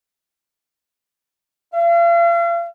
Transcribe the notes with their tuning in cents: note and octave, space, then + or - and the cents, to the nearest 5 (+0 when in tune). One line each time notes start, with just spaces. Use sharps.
F5 -40